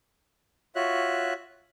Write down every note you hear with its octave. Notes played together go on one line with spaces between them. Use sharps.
F4 F#4 C#5 E5 F#6